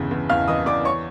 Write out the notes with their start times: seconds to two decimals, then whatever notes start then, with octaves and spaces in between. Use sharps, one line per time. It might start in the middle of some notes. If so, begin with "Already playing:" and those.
Already playing: G1 E2 C#3
0.11 E2
0.30 E2 F5 F6
0.48 E3 D#5 D#6
0.66 E2 D5 D6
0.85 C#5 C#6